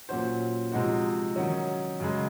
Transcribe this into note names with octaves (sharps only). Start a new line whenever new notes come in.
A#2 F#3 C#4 F#4 C5
C3 F3 G#3 D#4 F#4
D#3 F#3 C#4
F#2 C#3 G#3